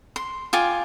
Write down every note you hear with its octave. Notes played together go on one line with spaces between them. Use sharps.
C6
F4 G5 G#5 D6